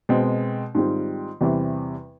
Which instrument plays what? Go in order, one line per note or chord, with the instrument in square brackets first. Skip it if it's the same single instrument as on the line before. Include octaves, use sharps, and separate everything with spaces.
[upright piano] B2 G#3 C4
G#2 D#3 G3 C4 F4
E2 C3 E3 G3 C4